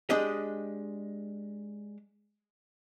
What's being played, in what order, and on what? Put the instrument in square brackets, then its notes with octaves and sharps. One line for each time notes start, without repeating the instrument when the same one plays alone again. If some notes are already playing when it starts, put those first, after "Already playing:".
[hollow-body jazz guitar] G#3 D4 G4 D#5